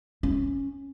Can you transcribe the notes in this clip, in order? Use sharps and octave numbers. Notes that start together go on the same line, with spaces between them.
C#4